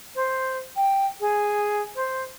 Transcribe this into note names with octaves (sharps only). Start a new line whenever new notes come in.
C5
G5
G#4
C5